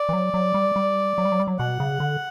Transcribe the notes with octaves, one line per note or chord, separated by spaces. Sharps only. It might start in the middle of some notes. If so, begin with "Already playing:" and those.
Already playing: D5
E3
F#3
F#3
G3
G3
F#3
G3
F#3
G3
F#3
B2 F#5
C#3
D3